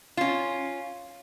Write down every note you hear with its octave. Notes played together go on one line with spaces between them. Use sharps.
C#4 F4